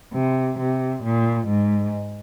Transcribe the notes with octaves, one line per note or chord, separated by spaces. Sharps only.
C3
C3
A#2
G#2